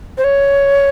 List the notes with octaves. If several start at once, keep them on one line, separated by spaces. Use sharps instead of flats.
C5
C#5